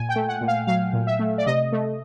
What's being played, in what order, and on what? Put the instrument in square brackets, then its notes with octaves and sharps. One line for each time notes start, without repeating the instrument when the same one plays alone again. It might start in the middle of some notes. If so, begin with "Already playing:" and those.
Already playing: [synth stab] A#2 G#5
G5
A3
F#5
A#2
F5
F#3 F5
A#2
E5
A3
D5
C3 D#5
A3